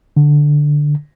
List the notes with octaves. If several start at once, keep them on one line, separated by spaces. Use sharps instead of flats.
D3